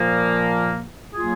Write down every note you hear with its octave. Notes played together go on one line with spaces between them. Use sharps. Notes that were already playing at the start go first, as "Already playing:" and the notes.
Already playing: A#2 F3 A#3
F#3 A#3 F4 G#4